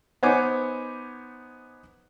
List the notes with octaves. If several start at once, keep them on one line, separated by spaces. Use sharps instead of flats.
B3 D#4 C5 C#5 G#5 D6